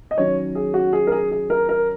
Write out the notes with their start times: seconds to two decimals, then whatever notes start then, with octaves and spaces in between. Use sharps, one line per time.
0.11 D#5
0.17 D#3 F#3 C#4 C#5
0.55 G#4
0.74 F#4
0.93 G#4
1.07 A#4
1.12 G#4
1.31 G#4
1.50 A#4
1.69 A#4